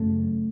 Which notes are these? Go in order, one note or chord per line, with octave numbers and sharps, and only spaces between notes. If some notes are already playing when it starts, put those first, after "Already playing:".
Already playing: F#2 C#3 A3